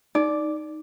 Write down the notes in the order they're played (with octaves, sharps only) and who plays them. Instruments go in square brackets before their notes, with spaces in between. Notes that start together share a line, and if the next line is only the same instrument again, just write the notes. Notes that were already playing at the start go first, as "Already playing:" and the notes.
[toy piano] D#4 [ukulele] D5